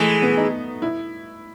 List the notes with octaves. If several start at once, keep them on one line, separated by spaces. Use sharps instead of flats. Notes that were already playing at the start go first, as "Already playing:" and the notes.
Already playing: E3 G#3 A3
B3
D#4
E4